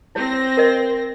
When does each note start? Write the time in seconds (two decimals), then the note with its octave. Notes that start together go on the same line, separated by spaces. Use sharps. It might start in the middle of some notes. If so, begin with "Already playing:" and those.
0.15 C4 E4 C5 C#5 A#6
0.57 A#4 D#5